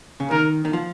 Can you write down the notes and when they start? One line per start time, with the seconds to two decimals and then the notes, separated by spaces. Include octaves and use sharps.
0.20 C#3
0.31 D#3 A#4
0.65 D#3
0.73 F3